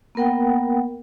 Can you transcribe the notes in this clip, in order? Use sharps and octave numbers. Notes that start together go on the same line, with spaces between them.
A#3 B3 A#4 F#5 G5